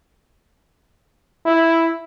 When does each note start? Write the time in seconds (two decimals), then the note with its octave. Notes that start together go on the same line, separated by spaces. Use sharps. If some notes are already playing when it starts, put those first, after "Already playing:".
1.46 E4